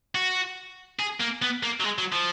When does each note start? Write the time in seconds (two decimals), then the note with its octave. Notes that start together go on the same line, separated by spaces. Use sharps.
0.15 F#4
1.00 G#4
1.20 A#3
1.42 B3
1.63 A#3
1.80 F#3
1.84 G#3
1.98 F#3
2.12 F3